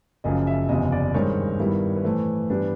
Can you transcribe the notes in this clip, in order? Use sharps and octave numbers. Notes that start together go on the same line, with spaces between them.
F#1 F#2 C#3 F3 D#5
E5
F#1 E2 C3 F3 D#5
D5
G2 D#3 G#3 C4 C#5
G2 D#3 G3 B3 E4
B4
A2 E3 A3 C5
G2 E3 G3 B3 D4